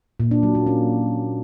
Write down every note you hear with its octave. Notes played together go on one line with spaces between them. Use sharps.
A#2
D4
F#3
A#3
C#4